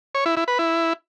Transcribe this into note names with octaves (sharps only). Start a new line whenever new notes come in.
C#5
E4
E4
B4
E4